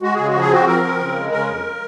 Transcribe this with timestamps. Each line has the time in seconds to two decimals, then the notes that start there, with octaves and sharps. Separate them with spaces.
0.02 G#3 F#4
0.15 C#3 G#4
0.28 F#4
0.34 F3
0.40 G#4
0.51 C4 F#4
0.67 F3 A#4
0.83 C4
0.99 C#3
1.16 G#3
1.31 C#3 A#4
1.48 F2